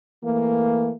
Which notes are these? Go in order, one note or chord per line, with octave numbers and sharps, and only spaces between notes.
E3 A3 A#3